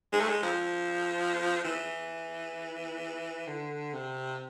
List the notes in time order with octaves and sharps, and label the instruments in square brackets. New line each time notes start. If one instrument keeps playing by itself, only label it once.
[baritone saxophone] G#3
A3
G#3
F3
E3
D3
C3